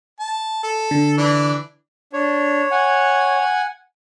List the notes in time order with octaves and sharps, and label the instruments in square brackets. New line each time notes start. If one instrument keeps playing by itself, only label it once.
[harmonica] A5
A4
[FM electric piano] D3
[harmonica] E3 D4
[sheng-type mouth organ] D4 [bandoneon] C#5
[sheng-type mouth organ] F#5 G#5